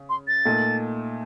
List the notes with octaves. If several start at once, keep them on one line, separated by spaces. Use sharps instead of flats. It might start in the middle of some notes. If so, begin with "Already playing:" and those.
Already playing: C#3
C6
A6
A#2 A3 D#4